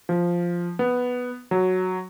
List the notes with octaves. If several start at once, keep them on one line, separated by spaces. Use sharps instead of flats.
F3
B3
F#3